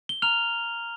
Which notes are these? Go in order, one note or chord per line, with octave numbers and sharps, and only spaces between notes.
G7
A#5 F6 F7